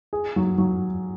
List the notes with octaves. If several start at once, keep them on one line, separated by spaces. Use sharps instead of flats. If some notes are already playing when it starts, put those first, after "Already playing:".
G#4
F#3
F#3